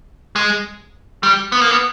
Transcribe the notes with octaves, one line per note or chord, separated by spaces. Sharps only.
G#3
G3
B3
A#3
B3